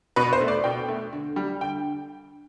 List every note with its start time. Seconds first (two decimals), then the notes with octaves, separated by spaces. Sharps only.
0.16 B2 B4
0.33 C5
0.41 A3
0.48 D5
0.64 B2 G5
0.89 A3
1.13 D3
1.36 G3
1.61 D3 G5